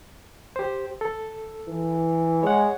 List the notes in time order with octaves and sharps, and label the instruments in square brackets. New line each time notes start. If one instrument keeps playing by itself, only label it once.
[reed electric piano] G4 C5
A4
[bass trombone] E3
[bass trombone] G#3 [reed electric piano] C#5 F#5